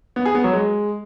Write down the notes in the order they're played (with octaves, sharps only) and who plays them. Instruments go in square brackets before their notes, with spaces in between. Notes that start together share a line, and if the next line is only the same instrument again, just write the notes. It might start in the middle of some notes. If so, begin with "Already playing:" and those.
[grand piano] B3
G#4
B3
F#3
G#3